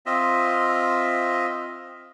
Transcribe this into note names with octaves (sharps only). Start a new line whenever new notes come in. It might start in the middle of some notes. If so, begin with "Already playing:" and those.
C4 F4 D#5 E5